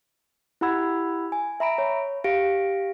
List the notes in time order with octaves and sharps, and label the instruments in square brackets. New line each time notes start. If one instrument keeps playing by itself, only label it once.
[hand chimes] E4 G4 F#5 B5 E6 G#6
G#5
E5 A#5 B5 D7
C#5
G4 F5 A#6 D7